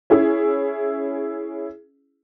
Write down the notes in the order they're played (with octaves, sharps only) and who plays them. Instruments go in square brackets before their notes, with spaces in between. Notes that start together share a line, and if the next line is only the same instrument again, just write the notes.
[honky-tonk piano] C#4 E4 G#4